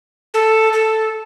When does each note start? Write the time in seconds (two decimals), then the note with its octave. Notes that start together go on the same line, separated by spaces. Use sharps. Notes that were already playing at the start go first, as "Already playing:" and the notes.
0.34 A4
0.73 A4